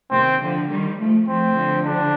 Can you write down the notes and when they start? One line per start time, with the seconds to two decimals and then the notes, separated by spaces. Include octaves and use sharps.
0.11 C3 D#3 C4
0.41 D3 F3
0.69 D#3 G3
0.99 F3 A3
1.28 F3 A3 C4
1.56 D3 F3
1.86 D4